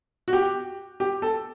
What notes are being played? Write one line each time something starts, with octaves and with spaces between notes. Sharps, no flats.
F#4
G4
G4
A4